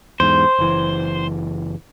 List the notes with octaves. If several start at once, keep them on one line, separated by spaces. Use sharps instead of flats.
E2 G#2 C5
F#1 E3